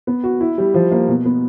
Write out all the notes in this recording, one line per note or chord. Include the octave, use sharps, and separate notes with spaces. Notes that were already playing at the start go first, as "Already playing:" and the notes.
B3
F#4
E4
G3
F3
A#3
B2
B3